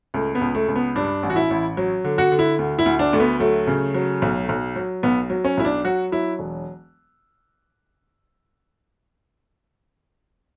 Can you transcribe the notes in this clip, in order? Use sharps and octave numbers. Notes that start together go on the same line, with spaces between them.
C#2 A3
B3
C#2
A3
C#2
B3
G2 D4
A1
F#4
E4
A1
F#3
D3
F#4
D3
E4
D2
E4
D2
D4
D2 A3
B3
F#3 A3
C#3
F#3
B1
B1
F#3
B1 B3
F#3
C#4
B1 E4
D4
F#3 F#4
F#3 E4
E1